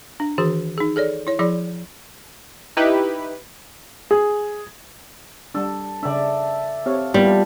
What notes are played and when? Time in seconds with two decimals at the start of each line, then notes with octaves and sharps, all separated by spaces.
0.20 D4
0.38 D#3 E3 F#4 G#4
0.78 D#4 G#4
0.96 G#4 A4 C#5 D5
1.27 E4 C#5
1.39 F3 E4 G#4 D5 B5
2.77 D#4 E4 G4 B4
4.11 G#4
5.55 G3 D4 A4
6.03 C#3 D4 A4 D5 E5
6.86 C4 G4 C#5 F5
7.14 F3 G3 A#3 B3 E4